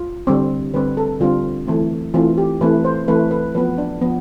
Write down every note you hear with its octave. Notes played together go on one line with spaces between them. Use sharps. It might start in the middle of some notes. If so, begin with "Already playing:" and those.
Already playing: F4
D3 G3 C4
D3 G3 C4 B4
A4
D3 G3 C4 F4
E3 A3 C4
E3 A3 C4 F4
G4
E3 A3 C4 B4
C5
E3 A3 C4 B4
B4
F3 B3 B4
D4
F3 B3